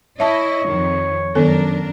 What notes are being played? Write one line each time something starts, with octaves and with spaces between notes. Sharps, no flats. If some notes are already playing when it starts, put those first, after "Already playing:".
E4 C#5 D#5 E5 A5
F2 D#3
F#2 D#3 B3 D4 A4 A#4